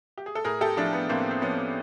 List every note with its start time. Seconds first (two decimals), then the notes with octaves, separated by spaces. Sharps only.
0.18 G4
0.26 G#4
0.35 A4
0.45 A2 G#4 A#4
0.61 G4 A4
0.77 F3 D4 E4
0.93 B3
1.09 A2 A#3 C4
1.31 C4
1.42 F3 B3 C#4